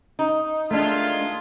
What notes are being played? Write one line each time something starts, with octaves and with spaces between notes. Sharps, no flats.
D#4
D#3 G#3 A3 D4 F4